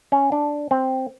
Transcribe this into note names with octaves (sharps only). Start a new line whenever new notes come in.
C#4
D4
C4